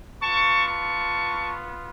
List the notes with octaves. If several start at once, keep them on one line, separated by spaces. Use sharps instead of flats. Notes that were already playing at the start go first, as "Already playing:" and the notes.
B3 F4 A5 C#6
A5 C#6